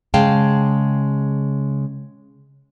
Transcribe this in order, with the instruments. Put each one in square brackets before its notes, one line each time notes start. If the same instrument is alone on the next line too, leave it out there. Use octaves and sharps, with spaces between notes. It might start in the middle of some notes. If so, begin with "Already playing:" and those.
[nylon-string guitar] C#3 G#3 F5 G5 A5